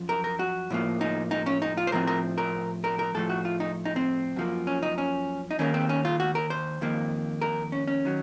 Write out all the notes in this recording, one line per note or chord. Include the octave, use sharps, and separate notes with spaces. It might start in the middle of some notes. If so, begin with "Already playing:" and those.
Already playing: F#2 F3
A#4
A#4
F#4
A2 F3 A#3
D#4
D#4
C#4
D#4
F4
C5
A2 F3 C4 A#4
A#4
A#4
A#4
A#4
A2 F3 A3 A4
F#4
F4
D#4
D#4
C4
F#2 F3 A#3
C#4
D#4
C#4
D#4
D#2 D#3 A#3 C#4
C4
C#4
F4
F#4
A#4
C5
F2 D#3 A#3
A#4
C#4
C#4
D#3 F#3